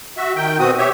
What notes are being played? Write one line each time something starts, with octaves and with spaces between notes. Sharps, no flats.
F#4 E5
D#3 G5
B2 C4 F#4 D#6
G4 C#5 E5